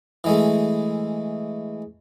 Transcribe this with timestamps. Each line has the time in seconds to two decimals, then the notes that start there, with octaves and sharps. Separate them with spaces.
0.24 E3 G#3 A3